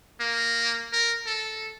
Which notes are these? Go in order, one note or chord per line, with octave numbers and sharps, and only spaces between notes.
A#3
A#4
A4